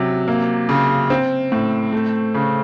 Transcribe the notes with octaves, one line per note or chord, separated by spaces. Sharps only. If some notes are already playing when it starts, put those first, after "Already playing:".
Already playing: C3 F#3
A#3
C#3
C4
A2
A3
C#3